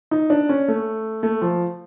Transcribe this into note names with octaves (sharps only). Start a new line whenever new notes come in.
D#4
D4
C#4
A3
A3
F3